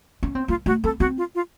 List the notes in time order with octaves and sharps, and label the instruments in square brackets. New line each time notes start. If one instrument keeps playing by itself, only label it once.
[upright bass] C#4
C4
[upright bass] A#3 [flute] F4
[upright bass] A3 [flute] F#4
[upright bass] C4 [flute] A4
[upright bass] C4 [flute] F#4
[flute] F4
F4